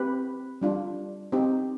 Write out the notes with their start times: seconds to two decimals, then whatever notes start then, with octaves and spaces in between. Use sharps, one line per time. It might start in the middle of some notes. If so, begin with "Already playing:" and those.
Already playing: C4 G4 B4
0.61 G3 D4 F4
1.32 C4 D#4 G4